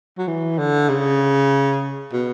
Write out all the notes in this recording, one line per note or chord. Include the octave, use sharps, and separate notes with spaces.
F#3
E3
D3
C#3
B2